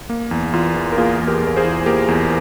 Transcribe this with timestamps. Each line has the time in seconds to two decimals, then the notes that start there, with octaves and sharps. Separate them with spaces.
0.10 A#3
0.31 E2
0.53 E2 F4
0.76 E3
0.92 A#4
0.98 A#3 F4 G#4
1.19 E2
1.27 G4 A#4
1.42 E2
1.47 A#4
1.56 G#4 C5
1.64 E3
1.86 A#3 G4 A#4
2.08 E2